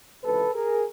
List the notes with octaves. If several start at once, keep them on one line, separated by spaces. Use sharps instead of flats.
C#2 C3 E3 A4 B4
G#4 A#4